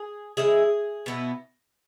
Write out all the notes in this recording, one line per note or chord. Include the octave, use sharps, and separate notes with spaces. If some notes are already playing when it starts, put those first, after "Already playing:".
Already playing: G#4
C#3 E3 G#3 E4 G#4
B2 B3 E4